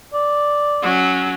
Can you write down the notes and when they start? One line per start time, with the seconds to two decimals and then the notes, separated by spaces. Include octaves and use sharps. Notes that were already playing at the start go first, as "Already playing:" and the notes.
0.14 D5
0.83 F#3 C#4